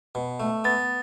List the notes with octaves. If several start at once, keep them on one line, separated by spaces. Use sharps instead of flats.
B2
A3
B3 A6